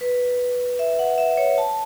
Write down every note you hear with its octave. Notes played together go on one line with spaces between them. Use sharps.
B4
E5
F#5
E5
C#5
A5